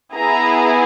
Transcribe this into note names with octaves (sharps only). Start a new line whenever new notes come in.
B3 E4 G#4 A#5